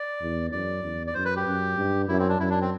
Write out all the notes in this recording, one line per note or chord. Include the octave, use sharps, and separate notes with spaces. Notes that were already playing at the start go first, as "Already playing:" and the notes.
Already playing: D5
E2
F#2 D5
E2
D5
F#2 C5
B4
G4
F#2
G2
F#2 E4
C4
D4
F#2 E4
D4
C4